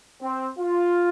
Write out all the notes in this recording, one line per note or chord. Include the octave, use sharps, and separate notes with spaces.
C4
F4